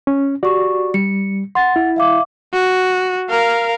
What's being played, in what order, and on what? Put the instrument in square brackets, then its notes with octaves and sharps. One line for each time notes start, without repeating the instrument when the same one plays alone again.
[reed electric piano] C#4
[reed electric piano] F#4 D5 [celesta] G4 C#6
[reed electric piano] G3 [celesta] C#7
[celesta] F#5 A6 [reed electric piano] C6
[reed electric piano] E4
[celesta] E5 F5 D6
[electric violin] F#4
A#4 F5